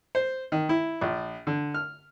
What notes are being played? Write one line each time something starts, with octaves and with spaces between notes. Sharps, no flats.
C5
D#3
E4
A#1
D3
F6